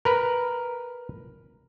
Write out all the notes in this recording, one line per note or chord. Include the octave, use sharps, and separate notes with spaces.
A#4 B4